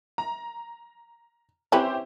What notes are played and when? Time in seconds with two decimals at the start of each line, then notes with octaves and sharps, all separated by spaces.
0.18 A#5
1.72 C4 C#4 E4 G4 B4 C5